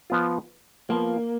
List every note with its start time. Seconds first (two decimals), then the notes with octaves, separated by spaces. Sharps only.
0.10 F3 B3 F4
0.89 F3 A#3 B3 F4